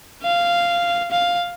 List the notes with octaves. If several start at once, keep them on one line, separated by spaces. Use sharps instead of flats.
F5
F5